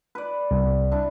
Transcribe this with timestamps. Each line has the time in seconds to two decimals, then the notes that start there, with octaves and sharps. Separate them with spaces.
0.15 B4 D5
0.51 C2
0.91 D4 E4